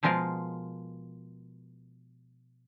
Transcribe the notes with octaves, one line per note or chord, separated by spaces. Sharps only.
B2 F3 G#3 F4 A#4